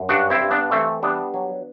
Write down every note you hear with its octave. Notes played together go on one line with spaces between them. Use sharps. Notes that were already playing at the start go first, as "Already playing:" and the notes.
Already playing: F#2
G2 D4 F#4
C4 E4
G2
B3 D4
E3 A3 C4
G3 B3 D4
F#3